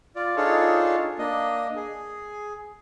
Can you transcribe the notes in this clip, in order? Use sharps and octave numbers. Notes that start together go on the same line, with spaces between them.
F4 D5
D4 D#4 F4 G#4 A4 C#5
A#3 D4 D#5
G#4